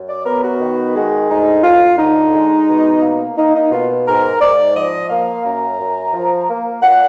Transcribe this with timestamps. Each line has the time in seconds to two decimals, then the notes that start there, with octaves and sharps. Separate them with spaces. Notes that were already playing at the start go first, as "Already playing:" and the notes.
Already playing: F#2
0.08 D5
0.25 B3 A#4
0.43 F#4
0.60 D#3
0.95 G#3
1.29 D2 D#4
1.63 D2 F4
1.98 D3 D#4
2.33 G#3
2.68 B2
3.02 A#3
3.37 A#3 D#4
3.55 D#4
3.71 B2 F4
4.07 G#2 A#4
4.41 G#2 D5
4.75 F3 D#5
5.09 A#3 F5
5.44 F#2 A#5
5.79 F#2
6.13 F3
6.49 A#3
6.82 A#2 F#5